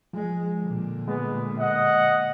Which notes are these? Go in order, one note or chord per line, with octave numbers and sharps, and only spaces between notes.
F3 G#3
A#2 D3
G#3 B3
D#5 F#5